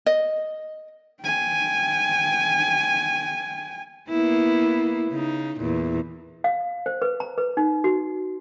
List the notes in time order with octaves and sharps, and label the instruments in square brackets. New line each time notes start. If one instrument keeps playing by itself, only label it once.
[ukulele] D#5
[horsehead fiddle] G5 G#5
[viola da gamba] A#3 B3 E4
C#3 D#4
E2 A#2
[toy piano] F5
C5
B4
A#5
B4
D#4
F#4